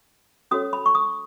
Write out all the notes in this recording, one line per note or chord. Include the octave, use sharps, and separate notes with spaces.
C#4 F#4 A4 C#5 D#6
B5
C#6
D#6